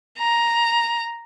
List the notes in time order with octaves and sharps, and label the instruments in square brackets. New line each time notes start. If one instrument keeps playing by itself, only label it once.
[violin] A#5